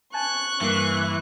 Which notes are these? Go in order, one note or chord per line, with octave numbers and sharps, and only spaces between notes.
G#5 A5 C#6 F#6
G2 E3 A#3 C7